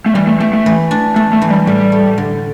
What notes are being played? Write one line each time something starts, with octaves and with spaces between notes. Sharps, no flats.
A3
E3 G3
A3
A3 G4
A3
E3
D4
A3 D4
A3
E3
G3
A2 G3
A3
D3